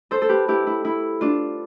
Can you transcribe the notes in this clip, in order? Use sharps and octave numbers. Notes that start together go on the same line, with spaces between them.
A4 C5
A4
G4 B4
E4 G4
E4
E4
D4 F4